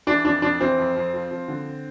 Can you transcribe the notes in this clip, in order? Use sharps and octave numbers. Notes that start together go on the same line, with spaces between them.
E3 D4
F2 D4
F2 D4
E3 C4
F2
F2
F3
F3
D3